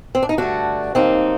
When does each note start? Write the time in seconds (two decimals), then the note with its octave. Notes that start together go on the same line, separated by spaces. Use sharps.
0.15 C4
0.22 D4
0.29 D#4
0.37 G2 D3 A3 D4 F#4
0.95 D#2 D#3 F#3 A#3 C4 D#4